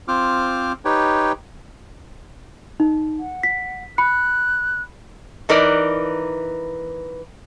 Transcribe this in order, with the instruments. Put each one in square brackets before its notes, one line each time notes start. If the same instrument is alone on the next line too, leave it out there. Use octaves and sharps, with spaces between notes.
[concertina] C4 F4 C5 D6 F6
D#4 G4 B4 C#5 G5
[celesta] D#4
[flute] F#5
[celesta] B6
[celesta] B5 C#7 [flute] F#6
[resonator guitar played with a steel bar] E3 D#4 A#4 B4 D5